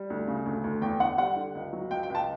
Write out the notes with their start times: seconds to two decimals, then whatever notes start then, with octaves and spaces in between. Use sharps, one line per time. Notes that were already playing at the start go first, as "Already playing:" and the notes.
Already playing: G3
0.10 D2
0.28 C#3
0.46 D2
0.64 D2
0.82 E2 G5
1.00 D3 F#5
1.18 G3 F#5
1.36 D3
1.55 C#2
1.73 F#3
1.91 C#2 G5
2.03 G5
2.10 C#2
2.15 A5